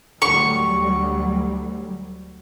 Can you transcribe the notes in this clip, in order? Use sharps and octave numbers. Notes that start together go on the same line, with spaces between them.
D2 F#3 G3 C#6